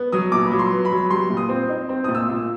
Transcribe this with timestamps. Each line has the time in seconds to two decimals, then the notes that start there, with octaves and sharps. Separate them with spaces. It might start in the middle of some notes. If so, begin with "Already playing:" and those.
Already playing: B3
0.12 F#3 D#6
0.32 A#2 D6
0.46 B5
0.51 F#3
0.59 C6
0.72 B3
0.85 B5
0.92 F#3
1.10 G3 C6
1.30 A#2
1.37 D#6
1.49 C4
1.69 D#4
1.89 C4
2.04 A#2 D#6
2.15 E6
2.28 A#2